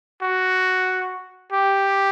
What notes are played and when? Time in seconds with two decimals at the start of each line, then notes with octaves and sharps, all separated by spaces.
0.23 F#4
1.53 G4